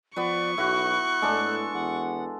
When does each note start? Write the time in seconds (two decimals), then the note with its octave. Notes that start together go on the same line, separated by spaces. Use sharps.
0.16 F3 B3 B4 D5 C#6
0.58 B1 E4 F#4 F#6
1.22 A2 G#3 D4 A4
1.74 E2 F#5